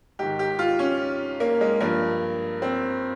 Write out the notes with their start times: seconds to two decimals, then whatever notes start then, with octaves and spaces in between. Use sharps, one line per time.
0.19 G#2 D#3 G4
0.39 G4
0.59 F4
0.79 C#4
1.40 A#3
1.61 G#3
1.81 G2 F3 A#3
2.62 C4